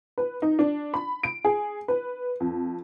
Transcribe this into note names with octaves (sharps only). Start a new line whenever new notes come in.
B4
D#4
D4
B5
D7
G#4
B4
F2